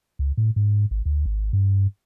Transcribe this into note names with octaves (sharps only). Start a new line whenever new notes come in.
C#2
A2
G#2
G#1
D2
G#1
G2